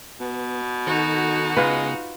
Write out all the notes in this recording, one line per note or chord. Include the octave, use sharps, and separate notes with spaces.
B2 B3
D#3 D#4 F#4 A4
C#3 G#3 B3 F4 B4